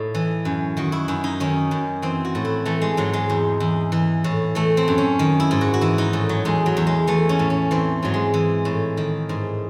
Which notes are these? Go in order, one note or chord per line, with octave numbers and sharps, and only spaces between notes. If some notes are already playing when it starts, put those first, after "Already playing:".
Already playing: A2 D#4
E3
F#2
D#3 F#4
E4
F#2 E4
D#4
D#3 C#4
F#2
E3 C4
F#4
A2
E4
E3 A3
G#3
G#2 F#3
G#3
E2
E2
E3
A2
E3 A3
C4
F#2
C#4
D#3
E4
G#2
F#4
F#4
E3 E4
D#4
A2
F#3
E2 G#3
F#3
E2
G#3
E3 A3
C#4
A2
C#4
E3 C4
G#2 F#3
G#3
E3
A2
D#3
G#2